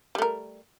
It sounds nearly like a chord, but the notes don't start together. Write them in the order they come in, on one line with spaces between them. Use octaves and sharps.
G3 A3 A#4